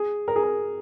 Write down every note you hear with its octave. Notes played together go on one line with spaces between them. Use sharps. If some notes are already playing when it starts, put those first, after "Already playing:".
Already playing: G#4
A#4
G#4
A#4